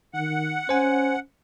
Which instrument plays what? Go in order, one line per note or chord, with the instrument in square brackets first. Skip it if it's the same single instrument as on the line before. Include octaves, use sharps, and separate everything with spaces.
[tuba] D#3 [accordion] F#5
[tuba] C#4 [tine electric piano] C5 G#5